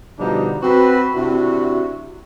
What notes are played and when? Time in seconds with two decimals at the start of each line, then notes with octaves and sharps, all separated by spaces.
0.18 B2 D3 F3 G3 D4 D#4
0.62 C4 F#4 B4
1.15 C3 D4 E4 F#4